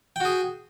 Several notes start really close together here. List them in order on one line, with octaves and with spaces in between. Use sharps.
G5 F#4 G#4